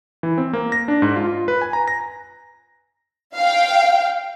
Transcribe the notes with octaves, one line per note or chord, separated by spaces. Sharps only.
E3
C4
A#3
A#6
D4
G#2
F4
F4
B4
G#5
A#5
A#6
F5 G5